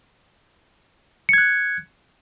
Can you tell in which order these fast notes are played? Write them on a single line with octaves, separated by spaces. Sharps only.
C#7 G#6 F#6